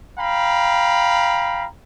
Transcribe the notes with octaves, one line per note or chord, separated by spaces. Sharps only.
F5 G5 A#5 B5